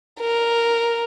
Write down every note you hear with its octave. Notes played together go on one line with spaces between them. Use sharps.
A#4